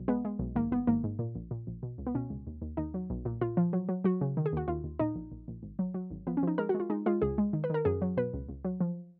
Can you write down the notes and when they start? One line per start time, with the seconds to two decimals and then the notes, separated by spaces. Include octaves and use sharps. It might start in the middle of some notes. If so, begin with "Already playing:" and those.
Already playing: B1
0.08 G#3 B3
0.25 G#3
0.39 B1
0.55 G#1 A#3
0.71 G#1 B3
0.87 G#1 A#3
1.04 G#2
1.19 A#2
1.35 A#1
1.51 A#2
1.67 A#1
1.83 B2
1.98 C#2
2.07 B3
2.15 B2 C#4
2.30 C#2
2.47 D#2
2.62 D#2
2.77 D#2 D#4
2.94 F#3
3.10 B1
3.25 A#2
3.41 A#2 F4
3.57 F3
3.73 F#3
3.89 F#3
4.04 F#3 F#4
4.21 C#3
4.37 D#3
4.46 G#4
4.53 D#2 F#4
4.68 D#2 F4
4.84 D#2
4.99 A#2 D#4
5.16 A#1
5.31 A#1
5.48 A#1
5.63 G#1
5.79 F#3
5.94 F#3
6.11 G#1
6.27 F3 B3
6.37 C#4
6.43 F3 D#4
6.58 G#3 A#4
6.69 F#4
6.74 G#3
6.80 F4
6.90 G#3 D#4
7.06 G#3 F4
7.22 C#2 G#4
7.38 G#3
7.53 D#3
7.64 B4
7.70 D#3 A#4
7.85 F#2 G#4
8.02 F#3
8.17 B2 B4
8.34 C#2
8.49 C#2
8.65 F#3
8.80 F3